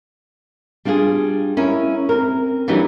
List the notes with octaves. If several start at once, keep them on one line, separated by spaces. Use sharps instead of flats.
G3 D4 F4 G4 G#4
C#4 D#4 E4 A#4
C4 A#4
E3 F#3 G3 D4 D#4